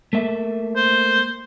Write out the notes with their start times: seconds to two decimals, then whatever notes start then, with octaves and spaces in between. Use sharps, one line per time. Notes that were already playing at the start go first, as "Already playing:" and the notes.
0.13 A3 A#3 E5
0.76 C5